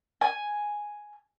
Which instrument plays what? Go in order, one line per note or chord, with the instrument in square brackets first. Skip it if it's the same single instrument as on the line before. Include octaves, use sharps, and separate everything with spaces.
[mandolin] G#5